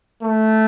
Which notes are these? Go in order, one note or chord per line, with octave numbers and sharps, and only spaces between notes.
A3